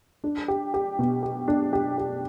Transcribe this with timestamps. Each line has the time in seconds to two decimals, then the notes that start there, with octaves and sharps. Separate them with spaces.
0.24 D4
0.48 G4
0.74 G4
0.99 B2
1.23 G4
1.48 D4
1.73 G4
1.98 G4